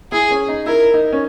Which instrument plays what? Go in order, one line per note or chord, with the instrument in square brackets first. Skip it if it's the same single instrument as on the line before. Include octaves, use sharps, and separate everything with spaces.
[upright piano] E4 [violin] G#4
[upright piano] C#4
D#4
[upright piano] E4 [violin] A#4
[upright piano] D#4
C#4